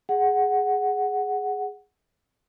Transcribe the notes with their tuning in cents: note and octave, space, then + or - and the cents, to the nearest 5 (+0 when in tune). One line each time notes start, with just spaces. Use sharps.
G#4 +0 F#5 +0